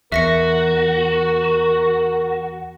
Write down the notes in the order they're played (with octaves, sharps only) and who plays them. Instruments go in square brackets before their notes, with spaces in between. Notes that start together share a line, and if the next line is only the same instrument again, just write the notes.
[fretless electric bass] E2 [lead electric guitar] F#4 [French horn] A#4 [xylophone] E5 A#6 C#7